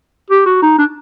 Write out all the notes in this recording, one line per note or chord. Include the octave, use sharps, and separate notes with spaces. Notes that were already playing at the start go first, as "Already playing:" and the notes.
G4
F#4
D#4
D4